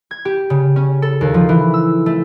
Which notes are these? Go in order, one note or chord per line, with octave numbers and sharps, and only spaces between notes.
G#6
G4
C#3
C#4
A4
D#2
F3
E3
E6
A3